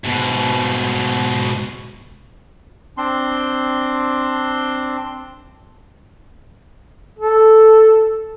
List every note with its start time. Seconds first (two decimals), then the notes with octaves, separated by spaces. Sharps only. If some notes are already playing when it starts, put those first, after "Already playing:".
0.05 G#2 B2
2.97 C4 D4 C6
7.19 A4